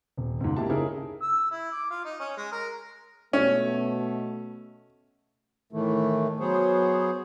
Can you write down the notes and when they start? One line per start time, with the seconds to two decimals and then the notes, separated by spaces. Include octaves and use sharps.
0.18 D#1
0.40 C#2 G#2
0.56 A#3 E4 G4 A5
0.69 C#3 D#4 E4 G#4 A#4
1.22 E6
1.51 E4
1.72 D6
1.90 F4
2.05 D#4
2.20 C#4
2.37 G#3
2.52 A#4
3.33 B2 A3 C#4
5.72 A2 D#3 E3 A3
6.40 F#3 B3 G#4 C5 C#5